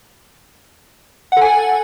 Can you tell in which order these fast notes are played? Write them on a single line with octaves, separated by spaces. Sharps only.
F#5 A4 G#5